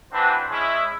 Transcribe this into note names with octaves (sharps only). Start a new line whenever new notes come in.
E3 C4 D4 F#4 B4 C5
G#3 C#4 E4